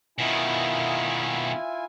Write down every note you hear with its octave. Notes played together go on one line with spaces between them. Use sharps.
B2 D#3 E4 F4 G#5